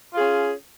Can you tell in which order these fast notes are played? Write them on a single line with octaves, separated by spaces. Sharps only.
F4 G#4 C#4